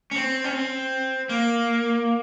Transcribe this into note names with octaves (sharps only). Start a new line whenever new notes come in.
C#4
C4
C#4
C4
A#3